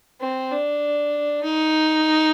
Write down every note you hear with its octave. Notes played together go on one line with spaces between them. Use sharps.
C4
D4
D#4